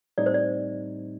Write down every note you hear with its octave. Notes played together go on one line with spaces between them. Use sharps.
A2 G3 C4 D#4 D5
C5
D5